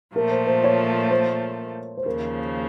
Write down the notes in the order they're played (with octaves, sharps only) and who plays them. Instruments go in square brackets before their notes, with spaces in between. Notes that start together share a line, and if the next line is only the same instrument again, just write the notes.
[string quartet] A#2 F3 A3 [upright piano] A#4
[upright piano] C5
C5
C#5
C5
C5
[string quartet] D#2 C#3 F3 [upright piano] A#4